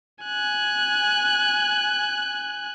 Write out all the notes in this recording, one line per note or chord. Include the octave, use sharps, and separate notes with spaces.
G#5 F#6